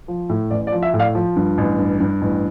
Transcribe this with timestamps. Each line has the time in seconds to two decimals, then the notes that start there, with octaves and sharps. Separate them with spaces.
0.08 F3
0.29 A2
0.50 A1 D5
0.67 D5
0.72 F3
0.83 E5
0.94 A2
0.99 D5 F5
1.15 F3
1.36 G2
1.58 A1
1.79 G2
2.00 G2
2.22 A1